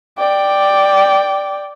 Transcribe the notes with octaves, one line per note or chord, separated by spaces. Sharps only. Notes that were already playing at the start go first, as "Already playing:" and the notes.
D5 G5